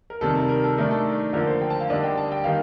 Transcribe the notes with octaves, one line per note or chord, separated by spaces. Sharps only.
A#4
C3 D#3 G3 A4
A#4
A#4
A4
D#3 A3 D4 A#4
A4
D3 F3 A#3 A#4
C5
G5
A5
F5
D3 G3 A#3 D4 D#5
G5
A5
G5
D#3 G3 A#3 D#4 F5